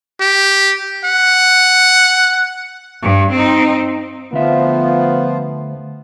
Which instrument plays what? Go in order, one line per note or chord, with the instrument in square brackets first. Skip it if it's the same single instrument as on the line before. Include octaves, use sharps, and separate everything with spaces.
[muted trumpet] G4
F#5
[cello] G2
C4 D#4
[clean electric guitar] D2 E5 [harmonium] F3 F4 [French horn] B3